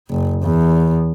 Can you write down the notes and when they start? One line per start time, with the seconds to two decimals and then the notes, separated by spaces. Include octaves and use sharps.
0.10 F#1
0.43 E2